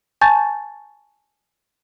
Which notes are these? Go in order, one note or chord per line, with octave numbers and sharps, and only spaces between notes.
G#5 A5 C#6 G6 A6